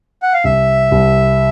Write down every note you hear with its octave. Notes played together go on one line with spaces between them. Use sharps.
F#5
F5
C2 E5
C2